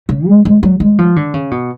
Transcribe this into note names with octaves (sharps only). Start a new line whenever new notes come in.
C#3
G#3
G#3
F#3
G#3
F3
D3
C#3
B2